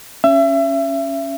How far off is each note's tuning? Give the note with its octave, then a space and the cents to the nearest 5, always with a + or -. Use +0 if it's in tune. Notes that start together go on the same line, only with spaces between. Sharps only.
C#4 +0 E5 +30